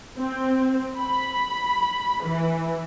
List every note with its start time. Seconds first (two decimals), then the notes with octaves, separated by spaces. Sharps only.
0.18 C4
0.99 B5
2.23 E3